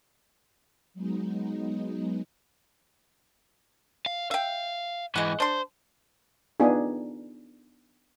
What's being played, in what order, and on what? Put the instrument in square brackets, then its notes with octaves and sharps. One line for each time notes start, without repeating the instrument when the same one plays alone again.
[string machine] F#3 G#3 B3 D#4
[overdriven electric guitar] F5
[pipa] E5 G5 [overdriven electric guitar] F5
[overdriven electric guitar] G#2 E3 [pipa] G#3 F#5
[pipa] D4 C6 [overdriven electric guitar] C5
[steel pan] B3 D4 D#4 F4 G#4